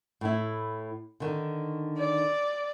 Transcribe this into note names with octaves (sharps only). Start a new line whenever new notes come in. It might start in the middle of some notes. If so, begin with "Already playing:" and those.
A2 E4
D3 D#3
D5